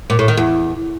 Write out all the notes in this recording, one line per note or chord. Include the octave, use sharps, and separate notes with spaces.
A#2
A2
D#3
E2